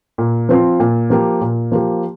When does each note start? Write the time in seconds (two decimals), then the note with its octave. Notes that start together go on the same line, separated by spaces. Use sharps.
0.18 A#2
0.49 F3 C4 F4
0.80 A#2
1.10 F3 A#3 G4
1.41 A#2
1.72 F3 A#3 G4